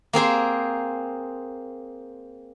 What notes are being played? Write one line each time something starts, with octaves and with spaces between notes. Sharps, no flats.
A#3 C4 G#4 C5